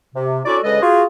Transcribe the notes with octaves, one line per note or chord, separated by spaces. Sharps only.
C3
C#4 D4 E4 F#4 A4 D5
D2 C#3 G#3 A4 B4 D#5
F4 F#4 G#4